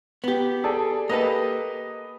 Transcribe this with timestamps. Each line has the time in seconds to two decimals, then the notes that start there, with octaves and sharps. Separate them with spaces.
0.24 B3 G4
0.64 G#4 A4 D5
1.09 A#3 G4 A4 B4 D#5